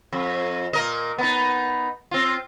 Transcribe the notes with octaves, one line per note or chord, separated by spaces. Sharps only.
F2
A#2 A#4 D#5
B3 D#4
C4 F4